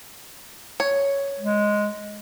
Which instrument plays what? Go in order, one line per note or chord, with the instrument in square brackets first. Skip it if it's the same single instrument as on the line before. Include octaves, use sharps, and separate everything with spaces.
[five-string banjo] C#5
[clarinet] G#3